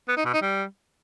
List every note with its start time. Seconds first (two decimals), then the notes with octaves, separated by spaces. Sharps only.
0.09 B3
0.17 D#4
0.25 B2
0.34 D#4
0.42 G3